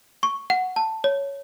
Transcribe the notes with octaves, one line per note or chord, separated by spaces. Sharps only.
C#6
F#5
A5
C#5